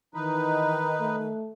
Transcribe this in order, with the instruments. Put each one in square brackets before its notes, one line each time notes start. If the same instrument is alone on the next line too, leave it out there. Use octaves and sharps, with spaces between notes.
[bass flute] D#3 [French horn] E3 [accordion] D#4 B4
[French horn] A3